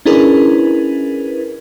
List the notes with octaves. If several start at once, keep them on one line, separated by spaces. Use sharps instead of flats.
C#4 D4 E4 G#4 A#4 B4